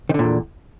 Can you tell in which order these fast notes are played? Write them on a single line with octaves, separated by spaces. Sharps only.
D#3 D3 A#2 E2